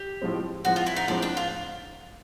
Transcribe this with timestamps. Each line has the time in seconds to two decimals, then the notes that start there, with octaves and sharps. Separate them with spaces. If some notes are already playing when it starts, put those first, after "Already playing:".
Already playing: G4
0.22 A2 F3 G#3 C4
0.65 A2 F3 G#3 C4 F#4
0.76 F4
0.86 E4
0.96 D#4
1.08 A2 F3 G#3 C4 D4
1.22 D4
1.37 F4